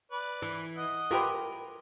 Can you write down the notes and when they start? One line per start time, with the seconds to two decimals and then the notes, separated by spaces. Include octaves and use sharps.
0.12 B4 D5
0.42 E3
0.77 D#5 F#5
1.11 F4 G4 A#4 B4